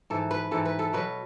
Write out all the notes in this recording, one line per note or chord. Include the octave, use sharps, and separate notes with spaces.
G#2 E3 A4
B4
G#2 E3 A4
B4
A4
B2 F#3 B4